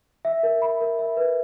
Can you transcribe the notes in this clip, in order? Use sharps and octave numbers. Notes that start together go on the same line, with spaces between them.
E5
A#4
B5
A#4
E5
B4